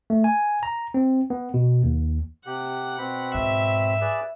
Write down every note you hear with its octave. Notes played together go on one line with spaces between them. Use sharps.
A3
G#5
A#5
C4
B3
B2
D#2
C3 G4 F#5
B2 C4 B5
G#2 E5
G#4 B4 D5